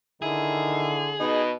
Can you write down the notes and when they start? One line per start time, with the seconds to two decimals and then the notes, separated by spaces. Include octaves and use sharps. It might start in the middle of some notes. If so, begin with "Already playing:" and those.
0.22 D3 D#3 E4 G#4
1.20 B2 D#4